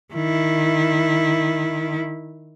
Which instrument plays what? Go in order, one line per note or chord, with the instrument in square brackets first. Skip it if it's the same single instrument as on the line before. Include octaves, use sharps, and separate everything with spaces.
[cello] D#3 E4